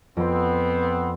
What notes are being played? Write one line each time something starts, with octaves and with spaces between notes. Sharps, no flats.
F2 B3 C4 C6